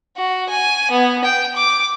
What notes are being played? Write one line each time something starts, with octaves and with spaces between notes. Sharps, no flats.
F#4
G#5
B3
G5
D6